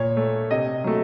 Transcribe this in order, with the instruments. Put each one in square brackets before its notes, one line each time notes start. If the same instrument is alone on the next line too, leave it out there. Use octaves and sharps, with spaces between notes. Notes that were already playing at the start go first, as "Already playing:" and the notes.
Already playing: [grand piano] A#2 C#5
A3
C3 D#5
F#3 A3